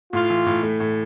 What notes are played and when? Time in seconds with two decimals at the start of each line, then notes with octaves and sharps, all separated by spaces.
0.13 A2 F4
0.30 E3
0.46 A2
0.63 A3
0.80 A2